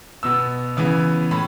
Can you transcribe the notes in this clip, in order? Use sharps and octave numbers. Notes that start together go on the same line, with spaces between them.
B2 B3 E6
C#3 E3 B3
A2 B5